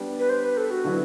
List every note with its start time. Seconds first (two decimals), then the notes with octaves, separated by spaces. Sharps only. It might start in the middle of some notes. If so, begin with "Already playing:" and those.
Already playing: G3 B3 D4 G4 D5
0.20 B4
0.29 C5
0.43 B4
0.57 A4
0.71 F#4
0.84 D3 F#3 B3 E4